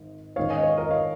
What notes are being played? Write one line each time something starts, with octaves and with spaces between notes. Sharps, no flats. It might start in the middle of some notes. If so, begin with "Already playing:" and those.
Already playing: G#1 G#2
G#2 D#3 G#3 C#4 C#5 F5
D#5 G#5
C#5 F5
A#4 D#5
C#5 F5